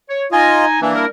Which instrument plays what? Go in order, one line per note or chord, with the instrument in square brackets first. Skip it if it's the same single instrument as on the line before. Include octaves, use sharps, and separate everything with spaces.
[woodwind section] C#5
[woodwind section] D#4 G#5 [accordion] F4 D#5
[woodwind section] E3 [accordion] A#3 D4 E4
[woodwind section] G3 A#4